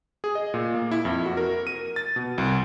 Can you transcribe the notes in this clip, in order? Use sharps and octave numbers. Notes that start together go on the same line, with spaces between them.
G#4
D#5
A#2
A#3
E4
F2
F#4
A#4
D#7
A6
B2
C2